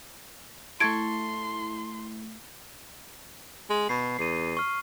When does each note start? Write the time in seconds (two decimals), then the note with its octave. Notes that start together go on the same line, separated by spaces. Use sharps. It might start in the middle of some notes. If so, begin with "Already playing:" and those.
0.80 A3 E4 A4 C6 C#6 G#6 D7
3.70 G#3
3.89 B2 C7
4.19 E2 C7 D#7
4.57 C#6 F6